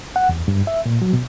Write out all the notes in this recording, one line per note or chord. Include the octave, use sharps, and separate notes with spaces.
F#5
E2
G2
E5
A#2
F#3
B2